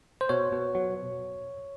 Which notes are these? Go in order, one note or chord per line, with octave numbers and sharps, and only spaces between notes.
C5
B2 C#5
B2
F#3